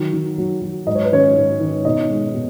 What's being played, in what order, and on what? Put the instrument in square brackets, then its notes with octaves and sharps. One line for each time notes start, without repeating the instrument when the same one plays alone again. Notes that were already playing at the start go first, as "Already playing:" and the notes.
Already playing: [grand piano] D#3 F#3
D#3
F#3
F#3
G#2 D#5
C#5
B4
D#3 C#4 C#5
G#2
D#3
B2 D#4 D#5
G#3
B2